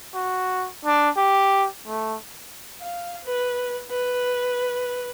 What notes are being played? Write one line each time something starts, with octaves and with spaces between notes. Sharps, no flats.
F#4
D4
G4
A3
F5
B4
B4